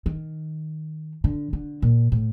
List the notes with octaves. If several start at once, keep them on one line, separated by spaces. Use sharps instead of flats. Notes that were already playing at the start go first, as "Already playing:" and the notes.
D#3
D3
D3
A#2
A2